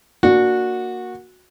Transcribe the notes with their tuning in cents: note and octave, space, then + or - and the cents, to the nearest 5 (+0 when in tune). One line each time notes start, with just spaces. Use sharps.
A#3 +0 D4 +0 F#4 -15